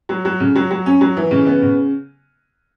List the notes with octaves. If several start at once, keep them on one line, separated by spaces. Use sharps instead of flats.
F#3
F#3
C#3
F#3
F#3
C#4
F#3
E3
C#3
B3
C#3